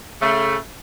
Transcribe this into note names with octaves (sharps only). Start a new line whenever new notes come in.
C#3 A3